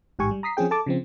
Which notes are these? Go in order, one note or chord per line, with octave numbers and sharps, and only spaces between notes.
A1 G#2 G4 G#5 C#6
G3
A#5 D#6 B6 C7
F3 C4 C#4 G#4 G5
A4 A5 D6
C#3 F3 C4